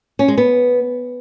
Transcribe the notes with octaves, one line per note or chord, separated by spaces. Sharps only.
C#4
G#3
B3